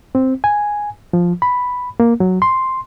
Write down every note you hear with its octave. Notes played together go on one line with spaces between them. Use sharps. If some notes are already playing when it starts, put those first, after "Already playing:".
C4
G#5
F3
B5
A#3
F#3
C6